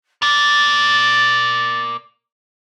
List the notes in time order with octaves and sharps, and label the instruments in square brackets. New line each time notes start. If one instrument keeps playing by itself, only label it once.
[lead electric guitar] A#4 D5 [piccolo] A6